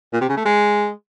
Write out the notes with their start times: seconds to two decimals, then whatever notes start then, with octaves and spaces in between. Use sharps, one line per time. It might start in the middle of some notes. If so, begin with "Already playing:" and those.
0.13 A#2
0.21 C3
0.29 C#3
0.37 A3
0.45 G#3